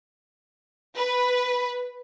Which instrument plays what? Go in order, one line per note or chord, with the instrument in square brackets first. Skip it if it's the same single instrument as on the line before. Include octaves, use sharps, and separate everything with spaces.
[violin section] B4